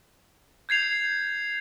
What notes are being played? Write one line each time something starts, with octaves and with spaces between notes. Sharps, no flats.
G6 G#6 C7 F7